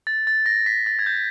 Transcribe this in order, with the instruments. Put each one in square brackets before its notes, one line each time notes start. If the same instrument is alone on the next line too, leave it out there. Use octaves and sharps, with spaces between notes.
[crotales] A6
A6
A#6
B6
A6
G#6
G6